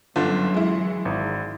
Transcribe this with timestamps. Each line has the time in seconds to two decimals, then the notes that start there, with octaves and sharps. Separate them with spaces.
0.16 G1 F#2 D3 E3 F#3 F4
0.54 G#3 E4
1.05 G#1